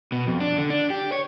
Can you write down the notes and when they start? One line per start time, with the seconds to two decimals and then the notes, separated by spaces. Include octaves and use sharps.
0.12 B2
0.27 F2
0.40 D4
0.58 D3
0.70 D4
0.90 G4
1.12 C#5